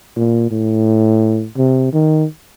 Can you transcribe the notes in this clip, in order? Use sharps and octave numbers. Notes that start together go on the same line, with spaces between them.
A#2
A2
C3
D#3